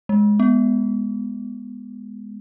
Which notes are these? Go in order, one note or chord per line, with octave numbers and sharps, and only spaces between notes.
G#3
B3